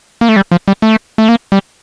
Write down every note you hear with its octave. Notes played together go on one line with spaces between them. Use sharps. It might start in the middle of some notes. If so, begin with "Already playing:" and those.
A#3
A3
G3
F3
G3
A3
A3
A#3
G3